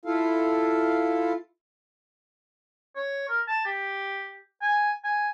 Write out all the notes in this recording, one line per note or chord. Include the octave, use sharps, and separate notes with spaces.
E4 F4 A4 F5
C#5
A#4
A5
G4
G#5
G#5